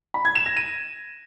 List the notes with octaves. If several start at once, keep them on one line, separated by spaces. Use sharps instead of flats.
B5
G#6
E7
A#6
D#7